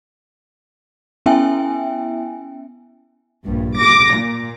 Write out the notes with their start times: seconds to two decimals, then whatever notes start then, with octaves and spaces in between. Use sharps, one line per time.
1.26 B3 C#4 E4 E5 G5 G#5
3.45 A#1 G2
3.79 D6 A#6
4.15 A#2